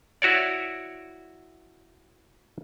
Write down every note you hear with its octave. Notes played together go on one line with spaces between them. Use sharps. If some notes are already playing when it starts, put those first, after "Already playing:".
E4 F#4 C#5 D5